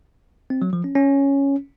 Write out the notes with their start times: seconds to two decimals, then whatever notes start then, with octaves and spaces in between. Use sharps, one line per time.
0.50 C4
0.62 F#3
0.73 F3
0.84 C#4
0.95 C#4